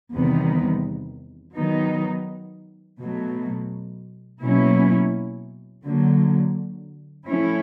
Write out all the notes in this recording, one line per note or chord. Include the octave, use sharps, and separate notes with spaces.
E2 C3 D#3 G3 B3
D#3 F#3 B3 D#4
B2 F#3 A3
B2 F#3 A#3 C#4 E4
D3 F#3 A#3
F3 A3 C#4 E4